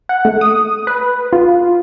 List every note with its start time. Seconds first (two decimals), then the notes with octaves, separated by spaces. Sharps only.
0.09 F#5
0.25 A3
0.41 D#6
0.87 B4
1.33 F4